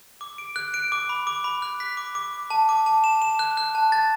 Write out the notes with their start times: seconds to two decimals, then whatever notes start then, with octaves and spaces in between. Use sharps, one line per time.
0.21 D6
0.38 D7
0.56 F#6
0.74 D7
0.92 D6
1.09 B5
1.27 D6
1.44 B5
1.62 F#6
1.80 B6
1.97 D6
2.15 D6
2.33 D6
2.50 A5
2.69 D6
2.86 A5
3.04 E7
3.22 E7
3.39 F#6
3.57 F#6
3.75 A5
3.92 A6